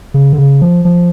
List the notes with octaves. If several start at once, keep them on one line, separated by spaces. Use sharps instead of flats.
C#3
D3
C#3
F3
F3